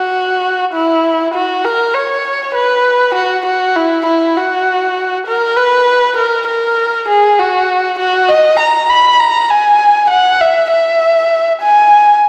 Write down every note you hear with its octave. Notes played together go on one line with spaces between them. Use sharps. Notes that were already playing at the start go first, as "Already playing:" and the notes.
Already playing: F#4
E4
F#4
A#4
C#5
B4
F#4
F#4
E4
E4
F#4
A#4
B4
A#4
A#4
G#4
F#4
F#4
D#5
A#5
B5
A#5
G#5
F#5
E5
E5
G#5